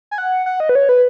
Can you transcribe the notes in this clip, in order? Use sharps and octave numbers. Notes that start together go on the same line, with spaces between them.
G#5
F#5
F#5
D#5
B4
C#5
B4